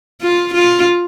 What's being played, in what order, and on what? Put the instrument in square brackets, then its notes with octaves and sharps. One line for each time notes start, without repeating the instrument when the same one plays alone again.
[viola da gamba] F4
F4